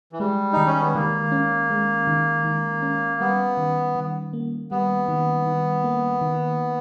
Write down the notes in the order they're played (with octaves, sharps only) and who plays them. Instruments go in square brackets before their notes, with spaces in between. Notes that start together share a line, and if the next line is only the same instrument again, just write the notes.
[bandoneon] E3
[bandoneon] G3 [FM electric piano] G#3
[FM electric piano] D#3 [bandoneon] D#4
[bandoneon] C#4
B3
[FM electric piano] D#3 [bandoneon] A#3
[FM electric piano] C#4
G#3
D#3
D#3
C#4
[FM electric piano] G3 [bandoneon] B3
[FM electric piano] D#3
D#3
A#3
[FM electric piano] G3 [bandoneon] B3
[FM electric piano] D#3
D#3
A#3
D#3